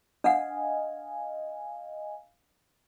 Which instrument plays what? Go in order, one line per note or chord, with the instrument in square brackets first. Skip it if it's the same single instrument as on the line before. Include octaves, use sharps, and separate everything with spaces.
[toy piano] D4 F#5 [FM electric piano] D#5 F5 G#5